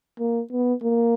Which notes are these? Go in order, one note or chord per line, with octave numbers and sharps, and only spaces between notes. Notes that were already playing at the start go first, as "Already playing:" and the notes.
A#3
B3
A#3